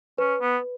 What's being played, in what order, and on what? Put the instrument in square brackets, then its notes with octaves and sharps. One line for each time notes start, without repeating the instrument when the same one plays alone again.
[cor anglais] C#4 [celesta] B4
[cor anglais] B3